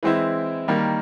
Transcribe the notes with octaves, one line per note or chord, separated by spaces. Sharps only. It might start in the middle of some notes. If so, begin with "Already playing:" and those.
E3 G#3 C4 E4
D#3 G3 A#3